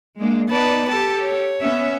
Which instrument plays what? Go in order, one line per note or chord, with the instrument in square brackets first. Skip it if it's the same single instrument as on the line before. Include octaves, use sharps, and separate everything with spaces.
[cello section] G#3 A#3 D4
[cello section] B3 D#4 D5 [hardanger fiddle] B4 A5
[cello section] G4 A4 [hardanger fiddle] A5
[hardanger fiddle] C#5
[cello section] B3 C#4 E5